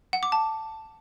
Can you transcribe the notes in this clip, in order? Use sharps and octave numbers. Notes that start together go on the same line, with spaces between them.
F#5
D6
A5